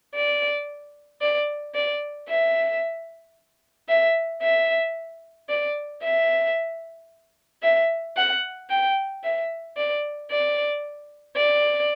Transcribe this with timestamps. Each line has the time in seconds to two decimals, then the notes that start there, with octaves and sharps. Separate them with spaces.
0.15 D5
1.21 D5
1.75 D5
2.29 E5
3.89 E5
4.42 E5
5.49 D5
6.03 E5
7.63 E5
8.17 F#5
8.70 G5
9.24 E5
9.77 D5
10.31 D5
11.37 D5